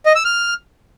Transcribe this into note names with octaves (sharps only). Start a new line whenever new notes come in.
D#5
E6
F6